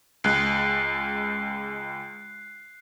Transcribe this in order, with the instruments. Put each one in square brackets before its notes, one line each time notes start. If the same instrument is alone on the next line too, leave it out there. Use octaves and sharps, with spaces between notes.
[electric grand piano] C#2 G#3 [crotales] F#6 C7